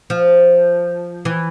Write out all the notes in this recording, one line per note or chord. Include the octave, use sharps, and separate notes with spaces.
F3
E3